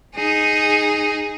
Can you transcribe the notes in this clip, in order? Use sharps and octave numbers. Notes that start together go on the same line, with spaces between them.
D#4 G#4